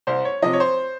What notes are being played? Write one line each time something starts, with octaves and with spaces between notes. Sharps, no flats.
C2 C5
C#5
C3 F3 D#5
C#5
C5